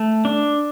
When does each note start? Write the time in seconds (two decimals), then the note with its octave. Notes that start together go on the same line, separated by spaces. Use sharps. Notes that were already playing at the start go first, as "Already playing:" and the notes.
Already playing: A3
0.25 D4